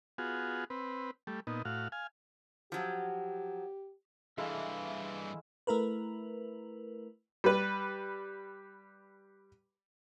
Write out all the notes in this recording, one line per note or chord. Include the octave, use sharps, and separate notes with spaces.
B3 F4 F#4 G#4
C4 B4
G3 A3
A#2 B3 D#4
A2 F#4 F5
F5 G#5
F3 F#3 G4
G2 E3 G#3 A3 E4 E5 F5
A3 E4 A#4 B4
G3 B4